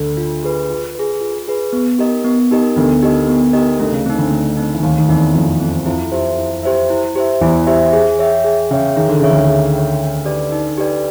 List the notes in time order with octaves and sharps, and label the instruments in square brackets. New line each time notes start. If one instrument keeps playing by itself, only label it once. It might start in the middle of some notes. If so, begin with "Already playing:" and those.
Already playing: [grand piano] D2 D3
[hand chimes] F4
G#4 B4
F4
G#4 B4
F4
G#4 B4
B3
D#4 G4 A#4 D#5
B3
D#4 G4 A#4 D#5
[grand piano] D2 D3 [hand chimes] B3
[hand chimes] D#4 G4 A#4 D#5
B3
D#4 G4 A#4 D#5
[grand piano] D2 D3 [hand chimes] A3
[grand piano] C#3
[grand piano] C#3 [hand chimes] C4 D#4
[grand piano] D2 D3
[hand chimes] A3
C4 D#4
[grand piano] E3
[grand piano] D#2 D#3 [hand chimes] A3
[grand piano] D#3
[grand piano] E2 E3 [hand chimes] C4 D#4
[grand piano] F2 F3 [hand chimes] A3
[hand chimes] C4 D#4
[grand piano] F2 F3 [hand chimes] E4
[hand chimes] G4 C5 E5
E4
G4 C5 E5
E4
G4 C5 E5
[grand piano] E2 E3 [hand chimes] E4
[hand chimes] G4 C5 E5
G#4
C#5 E5 G5
G#4
[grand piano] C#3 [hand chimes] C#5 E5 G5
[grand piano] D#3 [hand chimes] G#4
[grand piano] D3
[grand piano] C#3 [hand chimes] C#5 E5 G5
[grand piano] D2 D3
[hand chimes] G#4
C#5 E5 G5
D#4
G4 B4 D5
D#4
G4 B4 D5